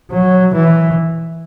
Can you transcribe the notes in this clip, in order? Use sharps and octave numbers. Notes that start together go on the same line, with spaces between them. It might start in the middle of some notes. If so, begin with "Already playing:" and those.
F#3
E3